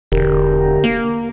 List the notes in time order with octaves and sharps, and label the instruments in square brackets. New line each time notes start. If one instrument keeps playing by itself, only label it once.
[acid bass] E1 [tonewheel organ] D3 G4 A#4
[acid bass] A#3